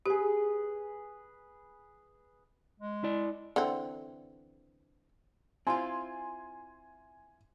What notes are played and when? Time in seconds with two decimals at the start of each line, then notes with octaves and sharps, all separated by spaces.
0.06 G4 G#4 B4
2.80 G#3
3.04 E4 D5
3.56 D3 E3 C4
5.67 C4 E4 F4 G#5 C6